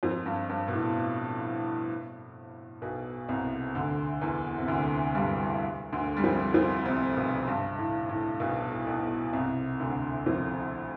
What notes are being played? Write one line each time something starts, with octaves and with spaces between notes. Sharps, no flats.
F2 F3
G2
G2
B2
A2
B1 B2
C2 C3
D2 D3
E2 E3
C3
D2 D3
G2 G3
D2 D3
G3
F2 F3
F2 F3
C2 C3
B1 B2
G2
A2
A2
B1 B2
B1 B2
C2 C3
D2 D3
F2 F3